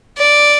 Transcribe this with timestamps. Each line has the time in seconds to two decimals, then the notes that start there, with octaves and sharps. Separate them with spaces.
0.18 D5